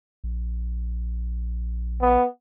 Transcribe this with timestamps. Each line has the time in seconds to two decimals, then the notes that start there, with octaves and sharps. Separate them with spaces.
0.24 A#1
2.02 B3